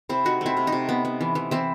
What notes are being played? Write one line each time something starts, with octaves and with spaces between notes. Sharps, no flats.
C3 C4 E4
A3 D#4 F#4
A3 C4 E4
C3
D#4
C3
B3
B3
E3
E3
E3 C4 E4